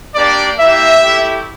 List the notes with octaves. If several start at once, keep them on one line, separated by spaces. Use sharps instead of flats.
A#3 D4 G4 D5
A#3 E4 G4 E5
A3 E4 G4